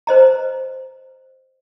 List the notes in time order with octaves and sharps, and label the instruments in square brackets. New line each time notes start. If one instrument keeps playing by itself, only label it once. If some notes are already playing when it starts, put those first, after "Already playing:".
[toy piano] B4 C5 D#5 A#5